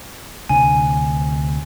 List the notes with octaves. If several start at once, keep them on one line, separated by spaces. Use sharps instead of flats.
D2 C3 D4 G#5